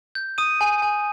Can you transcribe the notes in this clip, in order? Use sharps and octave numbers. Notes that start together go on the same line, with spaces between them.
G6
D#6 D#7
G#5
G#5